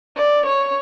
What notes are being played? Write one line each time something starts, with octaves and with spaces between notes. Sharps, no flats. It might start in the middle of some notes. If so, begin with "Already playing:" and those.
D5
C#5